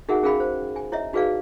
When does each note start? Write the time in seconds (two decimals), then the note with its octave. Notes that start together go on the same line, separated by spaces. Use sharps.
0.09 D#4 F#4 G#4 A#4 E5 F#5
0.23 C#4 G#4 A#4 F5 G5 B5
0.40 C5
0.76 G#5
0.92 E4 C#5 D#5 E5
1.13 D#4 F#4 G#4 B4 D5 F5